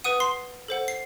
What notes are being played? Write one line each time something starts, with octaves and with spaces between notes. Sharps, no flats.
B4 F#5 D#6 D#7
C6 C7
A4 C5 F#5
C7